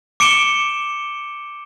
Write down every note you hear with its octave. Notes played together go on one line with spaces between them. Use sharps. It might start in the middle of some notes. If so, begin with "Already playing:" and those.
D6 C#7 D7 E7 G7